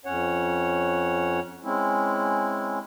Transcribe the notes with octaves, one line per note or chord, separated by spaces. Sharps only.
F2 C#4 C#5 F#5
G#3 C4 C#4 E4